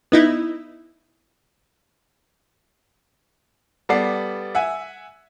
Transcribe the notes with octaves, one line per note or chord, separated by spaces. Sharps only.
B3 D#4 E4
G3 B3 A4 D5 C7
E5 F#5 G#5